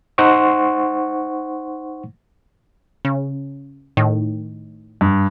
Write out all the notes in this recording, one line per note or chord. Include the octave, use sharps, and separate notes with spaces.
D#4 C5 F#5 C6 C#6
C#3
A2 D#3
G2